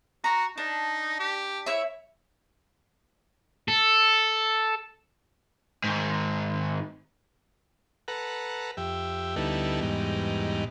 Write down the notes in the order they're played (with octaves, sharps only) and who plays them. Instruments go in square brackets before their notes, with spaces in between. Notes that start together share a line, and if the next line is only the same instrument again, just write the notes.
[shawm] F#4 [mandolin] A#5
[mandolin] D4 [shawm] D#4
[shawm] G4
[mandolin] E4 C#5 E5
[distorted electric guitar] A4
[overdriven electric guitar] G#2 D#3
[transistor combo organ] A4 B4 F#5 A#5
F2 G4 E5
D2 G3 B3 D#4 E4 A4
E2 G#2 B2 G3 D#4